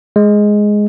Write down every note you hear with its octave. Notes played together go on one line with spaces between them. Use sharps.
G#3